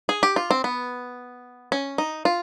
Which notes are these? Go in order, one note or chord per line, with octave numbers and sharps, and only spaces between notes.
G#4
G4
F4
C4
B3
C#4
D#4
F4